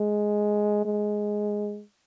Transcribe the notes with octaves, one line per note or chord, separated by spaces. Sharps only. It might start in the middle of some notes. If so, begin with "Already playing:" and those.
Already playing: G#3
G#3